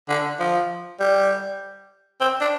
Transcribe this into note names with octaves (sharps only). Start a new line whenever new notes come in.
D3
F3
G3
C4
D4